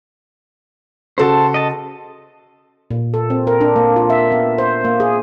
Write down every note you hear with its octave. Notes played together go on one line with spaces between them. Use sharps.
C#3 F#4 A4 C5 A5
D#5 A5
A#2
A4
C4
A#4
D4
A#3
F4
E5
B3
C5
A#3
G#4